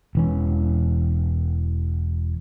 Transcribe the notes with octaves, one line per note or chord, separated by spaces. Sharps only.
E1 E3 C#4